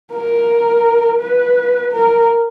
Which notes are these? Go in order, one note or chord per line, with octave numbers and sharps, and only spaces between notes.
A#4
B4
A#4